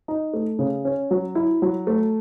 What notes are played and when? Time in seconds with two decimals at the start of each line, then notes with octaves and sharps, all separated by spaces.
0.08 D#4
0.33 A3
0.59 C#3
0.85 C#4
1.11 F#3
1.35 E4
1.62 F#3
1.87 A3